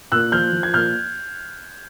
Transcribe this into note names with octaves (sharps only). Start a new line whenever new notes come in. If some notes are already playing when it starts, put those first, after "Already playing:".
A#2 E6 F#6
F3 F6 G6
F3
G#6
A#2 F6 G6